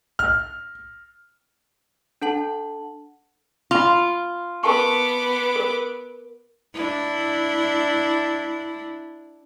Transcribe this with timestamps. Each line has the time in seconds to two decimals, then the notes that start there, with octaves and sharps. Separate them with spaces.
0.19 F6
2.22 D4 A4 F#5 A5 F#7
3.71 F4 B5 C6
4.63 B3 A#4 A5 C#6 D6
5.56 A#4
6.74 D4 E4